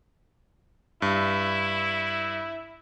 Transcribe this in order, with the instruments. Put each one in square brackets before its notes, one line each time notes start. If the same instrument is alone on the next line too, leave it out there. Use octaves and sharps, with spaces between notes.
[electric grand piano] G2 [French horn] E4